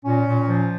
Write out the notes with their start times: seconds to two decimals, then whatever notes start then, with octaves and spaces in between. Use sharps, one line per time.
0.04 A#2 C#4
0.26 A#2
0.48 F3